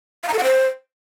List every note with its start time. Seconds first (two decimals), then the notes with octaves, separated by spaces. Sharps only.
0.23 F5
0.28 A#5
0.33 A4
0.38 F#5
0.43 C5